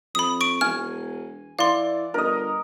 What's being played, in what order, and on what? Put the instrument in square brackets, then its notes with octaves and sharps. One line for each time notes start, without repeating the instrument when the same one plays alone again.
[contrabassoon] F2 [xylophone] B5 D#6
[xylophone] C#6 D7
[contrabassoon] E1 [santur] G#5 [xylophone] F6
[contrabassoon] E3 [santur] D5 [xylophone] F5 C6
[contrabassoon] G1 [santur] A#4 D#5